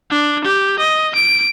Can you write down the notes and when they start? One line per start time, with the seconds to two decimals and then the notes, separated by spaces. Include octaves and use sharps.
0.10 D4
0.44 G4
0.79 D#5
1.15 D7